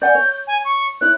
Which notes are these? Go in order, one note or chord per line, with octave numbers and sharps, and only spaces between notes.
D5 F#5 G#5 G6
C#5
G#5
C#6
E4 C#5 F#6